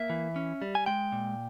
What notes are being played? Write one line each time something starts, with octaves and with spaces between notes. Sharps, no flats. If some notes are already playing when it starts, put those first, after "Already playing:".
Already playing: A#3 E5
E3
C#4
G3
G#5
G#3 G5
A#2